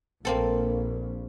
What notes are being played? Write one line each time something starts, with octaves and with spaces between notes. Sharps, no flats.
A#1 A#3 C4 A4